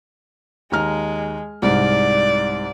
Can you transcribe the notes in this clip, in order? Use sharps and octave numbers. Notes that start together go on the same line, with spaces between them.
D#2 G#3 A#5 F6
C2 G#2 D5